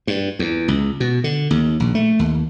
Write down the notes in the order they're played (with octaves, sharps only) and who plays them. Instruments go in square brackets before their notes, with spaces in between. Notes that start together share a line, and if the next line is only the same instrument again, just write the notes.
[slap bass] G2
E2
C#2
B2
D3
D#2
A#1
A3
D#2